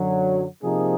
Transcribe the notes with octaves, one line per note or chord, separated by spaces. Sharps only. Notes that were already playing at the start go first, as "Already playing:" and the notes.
Already playing: F#2 D3 F#3
C3 F3 A#3 D#4 G#4